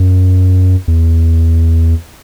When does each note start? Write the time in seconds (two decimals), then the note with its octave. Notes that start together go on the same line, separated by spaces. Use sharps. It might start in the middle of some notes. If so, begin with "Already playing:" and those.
Already playing: F#2
0.88 E2